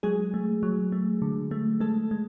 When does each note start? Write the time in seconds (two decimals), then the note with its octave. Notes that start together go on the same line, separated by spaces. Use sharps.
0.03 F#3 G#3 G#4
0.34 A3
0.63 F#3
0.92 A3
1.22 D3
1.51 A3
1.80 G#3 A3 A4
2.11 G#3